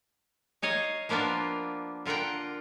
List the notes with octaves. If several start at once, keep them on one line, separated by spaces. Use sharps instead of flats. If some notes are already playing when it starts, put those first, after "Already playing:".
D#4 C#5 D#5 F5
F3 A#3 B3 D4 F4
D3 F4 A#4 F#5 G5